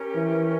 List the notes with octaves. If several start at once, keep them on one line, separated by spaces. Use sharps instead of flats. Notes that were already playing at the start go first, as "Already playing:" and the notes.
Already playing: C#4 G4 A#4
E3